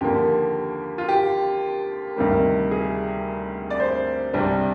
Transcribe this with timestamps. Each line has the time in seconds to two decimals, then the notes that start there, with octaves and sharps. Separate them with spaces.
0.01 D#2 D3 F3 A#3 G4
0.98 F4
1.09 G4
2.16 D2 C3 D#3 G3 A#3
2.71 G#4
3.70 D5
3.80 C5
4.34 C2 C3 G3 D4